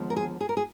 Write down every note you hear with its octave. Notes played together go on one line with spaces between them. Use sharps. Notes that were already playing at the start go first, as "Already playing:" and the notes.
Already playing: D#2 D3 F3 G#3 B3
A#4
G#4
G#4
A#4
G#4